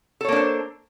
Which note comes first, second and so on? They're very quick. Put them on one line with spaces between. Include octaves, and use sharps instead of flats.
A4 C#5 A#3 D4 C5